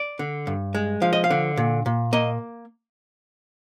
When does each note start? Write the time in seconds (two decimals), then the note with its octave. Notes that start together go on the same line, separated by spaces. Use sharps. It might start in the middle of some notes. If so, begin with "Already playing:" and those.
Already playing: D5
0.19 D3
0.47 G2
0.75 G#3
1.02 F3 F5
1.13 D#5
1.24 F5
1.30 D3
1.57 A#2
1.86 A#2
2.13 A#3 D#5